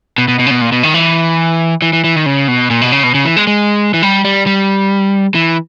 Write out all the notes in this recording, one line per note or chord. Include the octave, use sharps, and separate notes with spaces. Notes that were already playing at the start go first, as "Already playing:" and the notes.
B2
B2
B2
C#3
B2
A#2
B2
D#3
E3
E3
E3
E3
D#3
C#3
B2
A#2
B2
C#3
B2
C#3
E3
G#3
G#3
E3
G3
G3
G3
E3